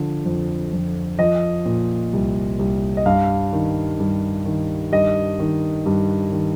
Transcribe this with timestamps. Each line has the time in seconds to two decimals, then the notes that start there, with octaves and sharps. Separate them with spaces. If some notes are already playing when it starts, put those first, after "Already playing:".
Already playing: D3 F3
0.26 F2
0.73 F2
1.19 F3 D#5
1.66 A#2
2.13 C2
2.59 C2
2.97 D#5
3.06 G2 F5
3.52 D#3
3.99 G2
4.46 D#3
4.92 G2 D#5
5.40 D#3
5.86 G2
6.32 D#3